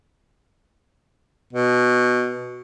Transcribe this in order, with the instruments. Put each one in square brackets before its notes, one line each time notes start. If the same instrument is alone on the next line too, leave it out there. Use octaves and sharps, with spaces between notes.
[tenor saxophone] B2